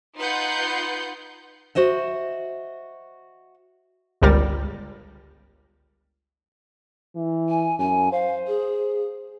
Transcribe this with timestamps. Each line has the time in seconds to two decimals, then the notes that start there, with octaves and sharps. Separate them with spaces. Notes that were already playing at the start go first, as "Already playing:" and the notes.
0.18 D#4 F4 B4 F#5 C6 G6
1.75 F#4 C5 D#5 E5
4.22 G1 C#2 G3 A#4 A6
7.15 E3
7.49 G#5
7.79 F#2 G#5
8.12 C5 F5
8.47 G#4